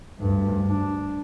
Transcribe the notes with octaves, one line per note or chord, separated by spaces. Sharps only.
D2 G2
D4